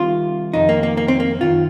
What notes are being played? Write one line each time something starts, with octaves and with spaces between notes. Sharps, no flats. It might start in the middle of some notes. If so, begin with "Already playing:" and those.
Already playing: C2 C3 D#3 F4
F2 C3 D#3 D#4
A#3
A#3
A#3
C4
A#3
F#2 D#3 F4